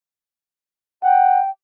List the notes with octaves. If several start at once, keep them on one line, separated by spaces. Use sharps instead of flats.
F#5 G5